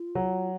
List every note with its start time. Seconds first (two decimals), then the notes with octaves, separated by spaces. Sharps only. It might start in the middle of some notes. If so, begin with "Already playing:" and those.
Already playing: F4
0.15 F#3